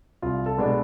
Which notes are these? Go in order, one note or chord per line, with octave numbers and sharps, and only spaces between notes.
C2 F4
A4
B2 G#3 B3 D4